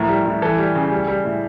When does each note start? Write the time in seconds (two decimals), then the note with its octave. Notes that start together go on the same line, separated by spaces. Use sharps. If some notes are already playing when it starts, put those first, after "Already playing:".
Already playing: A2 F3 A#4
0.09 G3
0.26 A2
0.42 E3 A4
0.58 G3
0.75 C#3
0.92 G3
1.08 G3
1.25 A2